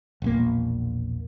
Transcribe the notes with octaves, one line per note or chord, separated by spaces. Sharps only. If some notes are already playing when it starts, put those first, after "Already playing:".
E1 A#1 A#3